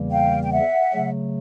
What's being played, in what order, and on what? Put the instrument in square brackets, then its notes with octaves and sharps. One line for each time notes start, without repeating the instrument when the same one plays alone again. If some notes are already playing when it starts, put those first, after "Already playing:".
Already playing: [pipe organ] E2 C#3 E3 G3 A#3
[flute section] F5 G5
G5
E5 F#5
[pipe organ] C#3 F#3 A3